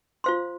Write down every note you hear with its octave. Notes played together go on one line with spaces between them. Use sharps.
F4 C5 F5 C6